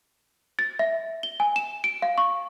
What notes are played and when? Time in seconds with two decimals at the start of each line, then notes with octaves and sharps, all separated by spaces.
0.59 A6
0.79 E5
1.23 G7
1.40 G#5
1.56 E7
1.84 D7
2.02 F5
2.18 C#6